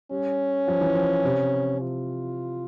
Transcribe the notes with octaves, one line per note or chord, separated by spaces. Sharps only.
G3 C#4
F3
E3
F3
C3
F4